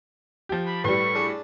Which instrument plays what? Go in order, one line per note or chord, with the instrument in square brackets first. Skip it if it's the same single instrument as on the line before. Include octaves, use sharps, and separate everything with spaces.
[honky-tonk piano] F3 G4
[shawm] B5
[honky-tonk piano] A2 G3 [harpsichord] B4 [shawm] C#6
[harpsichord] D4 G#4